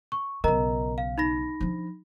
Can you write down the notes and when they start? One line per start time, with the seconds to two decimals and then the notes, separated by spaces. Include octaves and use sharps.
0.12 C#6
0.44 B1 C#3 A#4 D#5 A#5
0.98 F5
1.18 D#4 B5 A#6
1.60 F3 D4